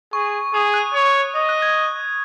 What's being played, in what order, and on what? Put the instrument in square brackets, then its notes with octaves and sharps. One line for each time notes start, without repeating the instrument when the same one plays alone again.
[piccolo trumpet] G#4 [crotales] C#6
[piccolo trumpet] G#4 [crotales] D#6
[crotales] F#6
[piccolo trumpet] C#5
[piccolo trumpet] D#5 [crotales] D#6
[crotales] F#6
G#6